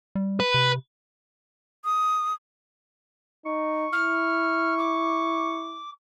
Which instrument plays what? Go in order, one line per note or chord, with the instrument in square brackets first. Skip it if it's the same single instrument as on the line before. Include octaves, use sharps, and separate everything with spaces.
[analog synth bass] G3
[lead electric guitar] B4
[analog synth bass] C3
[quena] D#6
[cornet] D#4 [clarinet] C#6
[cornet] E4 [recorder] F6
[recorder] D6